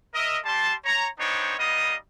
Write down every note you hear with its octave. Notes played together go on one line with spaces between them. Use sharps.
A#4 D#5 E5
G3 A5 C6
C#5 A#5
B3 C4 D4 D#4 C5 C#5
G3 B3 D#4 D#5 F5 D#6